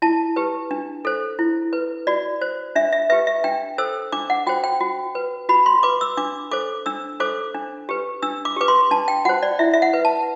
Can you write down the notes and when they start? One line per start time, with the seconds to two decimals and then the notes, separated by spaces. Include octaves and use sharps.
0.02 E4 A5
0.36 G4 B4
0.71 D4
1.05 A4 C5
1.39 E4
1.73 B4
2.07 F#4 D5
2.41 C5
2.75 D4 E5
2.92 E5
3.10 G4 B4 E5
3.27 E5
3.44 D4 G5
3.78 A4 C5 E6
4.12 D4 D6
4.30 F#5
4.47 F#4 C5 G5
4.64 G5
4.80 F#4
5.15 B4
5.49 F#4 B5
5.66 C6
5.83 B4 D6
6.01 E6
6.17 D4 D6
6.51 A4 C5 D6
6.86 D4 E6
7.20 A4 C5 D6
7.55 D4
7.89 G4 B4
8.22 D4 E6
8.45 D6
8.56 G4 B4 D6
8.68 C6
8.91 D4 A5
9.08 G5
9.25 F#4 C5 F#5
9.43 D5
9.59 E4 E5
9.74 E5
9.82 F#5
9.93 B4
10.05 A5